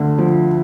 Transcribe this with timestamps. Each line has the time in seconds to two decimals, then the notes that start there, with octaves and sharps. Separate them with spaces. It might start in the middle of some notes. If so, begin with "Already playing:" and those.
Already playing: D2 D3
0.18 F3